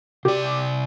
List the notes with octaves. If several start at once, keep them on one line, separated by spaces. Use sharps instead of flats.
C3 G4 D5